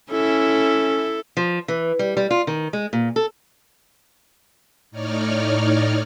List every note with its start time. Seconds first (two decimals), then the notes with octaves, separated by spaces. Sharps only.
0.11 C#4 E4 A4
1.37 F3
1.68 E3
1.99 G3
2.17 G3
2.31 F4
2.47 D#3
2.73 G#3
2.93 A#2
3.16 A4
4.91 A2 D#4 C#5 D5 F6